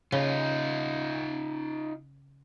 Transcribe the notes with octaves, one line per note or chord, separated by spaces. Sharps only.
C#3 D#4 F4